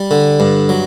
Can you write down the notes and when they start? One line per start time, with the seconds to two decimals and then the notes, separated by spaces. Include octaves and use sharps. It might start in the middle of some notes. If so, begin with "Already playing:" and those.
Already playing: G3
0.11 D3
0.40 G2
0.69 F#3